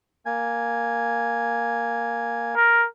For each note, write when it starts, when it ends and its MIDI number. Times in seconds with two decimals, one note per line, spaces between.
0.26 2.55 58
0.26 2.55 80
2.56 2.86 70